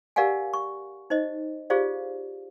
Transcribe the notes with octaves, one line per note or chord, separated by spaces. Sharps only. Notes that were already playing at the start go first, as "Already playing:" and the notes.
G4 A#4 D5 F5 F#5 G#5
C#6
D#4 C5 D#5
F4 G4 G#4 C5 D5 F5